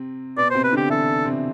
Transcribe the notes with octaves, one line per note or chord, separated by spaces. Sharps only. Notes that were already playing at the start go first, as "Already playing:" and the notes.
Already playing: C3 C4
B2 B3 D5
C5
C3 C4
B4
D3 D4 G4
E3 E4 A4
C3 C4